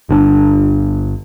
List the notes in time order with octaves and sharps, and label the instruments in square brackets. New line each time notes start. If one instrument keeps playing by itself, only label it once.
[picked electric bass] G1 D3 C#4 D4